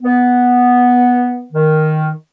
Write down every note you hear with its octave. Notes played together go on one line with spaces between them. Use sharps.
B3
D#3